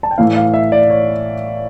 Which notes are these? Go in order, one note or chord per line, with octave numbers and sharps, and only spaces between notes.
A5
G5
A2 E3 A3 F5
F5
E5
D5
C#5